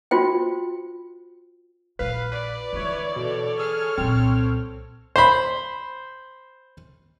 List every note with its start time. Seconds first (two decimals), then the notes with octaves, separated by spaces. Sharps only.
0.11 F4 F#4 C5 G5
1.99 A#1 F4 B4 F5
2.32 B4 D5
2.73 D3 E3 E4 C#5
3.16 B2 A4 C#5
3.59 G#4 F6
3.98 C2 A#2 C4
5.16 C5 B5